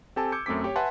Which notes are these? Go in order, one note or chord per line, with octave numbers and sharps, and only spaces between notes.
C4 G4 A4 G#5 A5
D6 E6 G6 G#6 C#7
F#2 A3 C4 D6 B6
G4 C#5
B4 E5 F#5 G#5 A5 C6